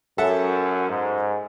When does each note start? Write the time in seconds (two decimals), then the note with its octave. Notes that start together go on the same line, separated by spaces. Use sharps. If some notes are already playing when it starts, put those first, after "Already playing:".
0.18 F#2 A4 E5 F#5
0.89 G#2